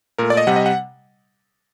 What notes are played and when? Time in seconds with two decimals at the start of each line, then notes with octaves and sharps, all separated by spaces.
0.18 A#2 A3 A#4
0.30 D5
0.37 D#5
0.47 C3 G3 F#5
0.56 D#5
0.66 F#5